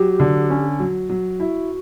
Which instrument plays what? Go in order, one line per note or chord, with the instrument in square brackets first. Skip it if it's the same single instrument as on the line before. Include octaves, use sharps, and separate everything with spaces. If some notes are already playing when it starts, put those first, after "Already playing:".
Already playing: [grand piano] F#3 [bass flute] G4
[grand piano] D3
C#4
F#3
F#3
[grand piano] E4 [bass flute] F#4